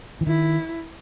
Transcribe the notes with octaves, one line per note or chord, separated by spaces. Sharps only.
E3
D#3 E4